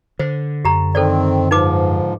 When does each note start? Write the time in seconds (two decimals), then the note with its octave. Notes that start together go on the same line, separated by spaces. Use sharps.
0.19 D3 C5
0.65 F#2 G4 A#5
0.95 D#3 C4 A4 C5 D5
1.51 G#2 F3 D#4 B4 D6